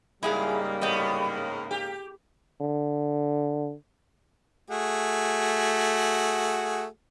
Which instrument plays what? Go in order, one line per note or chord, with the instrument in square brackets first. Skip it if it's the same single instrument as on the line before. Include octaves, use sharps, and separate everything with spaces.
[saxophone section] G#2 C#3 A#3 [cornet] G3 [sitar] G#3 [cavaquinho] E4 G#4 F5
[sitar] A2 B3 [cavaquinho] D#5 G5
[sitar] G4
[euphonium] D3
[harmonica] A3 F#4 G#4